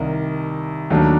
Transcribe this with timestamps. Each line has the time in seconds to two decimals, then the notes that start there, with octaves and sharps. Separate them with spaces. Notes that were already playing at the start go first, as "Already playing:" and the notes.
Already playing: C2 C3 D#3
0.90 D#2 D#3 F#3 A3 D4